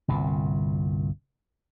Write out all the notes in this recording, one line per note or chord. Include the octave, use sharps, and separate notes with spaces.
G1 C2 A#2